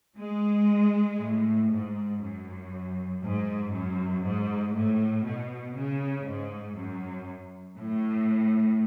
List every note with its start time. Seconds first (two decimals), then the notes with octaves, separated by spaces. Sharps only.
0.19 G#3
1.20 A2
1.71 G#2
2.22 F#2
3.23 G#2
3.73 F#2
4.24 G#2
4.75 A2
5.25 B2
5.76 C#3
6.26 G#2
6.76 F#2
7.77 A2